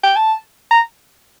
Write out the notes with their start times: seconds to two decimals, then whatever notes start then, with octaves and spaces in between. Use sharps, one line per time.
0.03 G5
0.16 A5
0.71 A#5